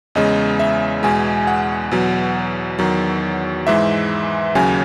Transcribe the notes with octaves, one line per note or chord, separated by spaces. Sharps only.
E2 C#3 G#3 D#5
E5
E2 B2 G#3 G#5
F#5
E2 B2 F#3
E2 D#3 F#3
G#2 E3 G#3 E5
D#2 C#3 F#3 G#5